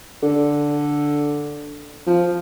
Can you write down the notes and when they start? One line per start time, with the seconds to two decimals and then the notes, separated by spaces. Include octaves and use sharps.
0.23 D3
2.07 F3